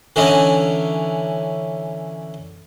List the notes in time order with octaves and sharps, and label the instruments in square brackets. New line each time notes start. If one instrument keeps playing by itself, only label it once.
[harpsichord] D3 E3 C#4 D#4